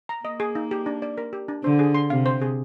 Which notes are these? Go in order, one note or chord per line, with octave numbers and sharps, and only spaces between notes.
A#5
A#3 D#5
G#4
D#4
G4
D4
D5
A#4
G4
D4
D3 C5
G#4
C6
C3 F5
C5
G#4